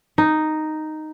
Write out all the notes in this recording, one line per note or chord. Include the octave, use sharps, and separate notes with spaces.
D#4